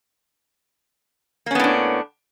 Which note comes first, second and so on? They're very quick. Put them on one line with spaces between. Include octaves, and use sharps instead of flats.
A#3 C#4 B3 A2 D4